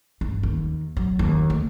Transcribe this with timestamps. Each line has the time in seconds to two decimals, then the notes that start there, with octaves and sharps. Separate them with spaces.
0.21 G2
0.43 D#2
0.97 F#3
1.19 D#2
1.50 D2